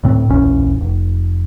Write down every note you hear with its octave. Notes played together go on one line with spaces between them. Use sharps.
D2 A2 C4
D1 A#1 E2 C#4
F1